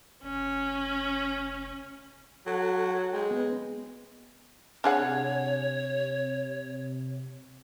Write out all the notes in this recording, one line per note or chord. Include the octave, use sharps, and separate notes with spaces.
F1 C#4
F#3 A4 F#5
G#3 G5
B3
C3 D4 G#4 C#5 F#5